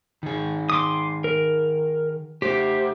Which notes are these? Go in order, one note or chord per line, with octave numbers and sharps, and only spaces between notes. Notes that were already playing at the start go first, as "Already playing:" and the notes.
D#3 G#4
C6 D6 D#6
A#4
A3 G4 C5